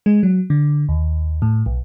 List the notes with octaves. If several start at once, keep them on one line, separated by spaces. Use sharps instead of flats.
G#3
F#3
D3
D#2
A2
B1